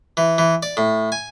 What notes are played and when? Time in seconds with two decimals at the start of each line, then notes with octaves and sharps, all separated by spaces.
0.17 E3
0.38 E3
0.63 D5
0.77 A2
1.12 G#5